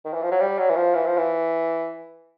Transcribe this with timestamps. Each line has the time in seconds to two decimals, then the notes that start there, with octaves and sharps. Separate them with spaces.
0.05 D#3
0.14 E3
0.23 F3
0.32 F#3
0.40 G3
0.59 F#3
0.69 E3
0.76 F3
0.95 E3
1.06 F3
1.17 E3